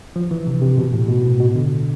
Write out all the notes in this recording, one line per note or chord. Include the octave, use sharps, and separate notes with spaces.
F3
E3
C3
C3
B2
A2
B2
A2
B2
D3